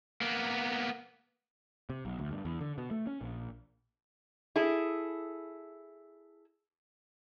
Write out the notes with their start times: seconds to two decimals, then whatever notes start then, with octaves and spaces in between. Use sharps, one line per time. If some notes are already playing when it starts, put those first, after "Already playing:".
0.21 A#3 B3
1.90 C3
2.05 B1
2.19 D2
2.31 G2
2.45 E2
2.61 D3
2.78 B2
2.91 A3
3.07 C#4
3.21 A#1
4.56 E4 G#4 A4